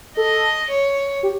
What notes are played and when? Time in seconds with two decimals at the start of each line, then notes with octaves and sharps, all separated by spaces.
0.17 A4 D#5
0.70 C#5
1.23 G4